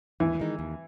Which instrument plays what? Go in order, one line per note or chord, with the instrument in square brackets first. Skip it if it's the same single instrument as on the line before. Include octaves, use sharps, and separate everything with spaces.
[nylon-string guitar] D#2 [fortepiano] E3
[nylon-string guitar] D#3 G#3 D#4
D#2